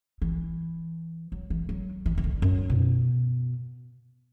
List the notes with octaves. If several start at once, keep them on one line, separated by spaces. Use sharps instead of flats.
E3
F#3
E3
F#3
E3
E3
D3
F#2
B2